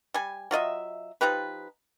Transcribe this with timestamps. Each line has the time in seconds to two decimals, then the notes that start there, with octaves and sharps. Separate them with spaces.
0.14 G3 G#5
0.51 F#3 F4 D#5 E5
1.21 F3 D#4 G4 B4